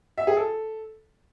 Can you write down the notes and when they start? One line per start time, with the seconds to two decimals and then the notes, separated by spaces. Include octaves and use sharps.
0.18 E5
0.27 G#4
0.37 A4